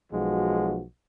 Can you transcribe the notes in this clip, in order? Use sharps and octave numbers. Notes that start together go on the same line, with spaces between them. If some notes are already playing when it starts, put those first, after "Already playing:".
B1 F3 G#3 F#4